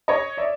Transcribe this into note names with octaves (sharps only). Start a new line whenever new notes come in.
C#5 D#5
D5 E5